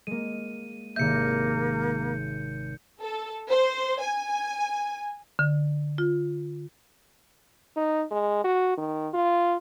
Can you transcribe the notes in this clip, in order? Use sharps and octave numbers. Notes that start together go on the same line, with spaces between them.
G#3 A#3 D#7
G#1 C3 A#3 E5 G6 C#7
A4
C5
G#5
D3
F4
D#4
G#3
F#4
D#3
F4